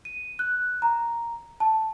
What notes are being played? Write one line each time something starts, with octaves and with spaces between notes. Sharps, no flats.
D#7
F#6
A#5
A5